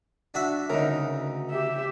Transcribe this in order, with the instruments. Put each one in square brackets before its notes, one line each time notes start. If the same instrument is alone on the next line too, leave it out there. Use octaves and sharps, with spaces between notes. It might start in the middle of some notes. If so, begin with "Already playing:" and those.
[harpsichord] D4 F#4 E5
[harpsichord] D2 C#3 [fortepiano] D#4 A#4
[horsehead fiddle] G4 E5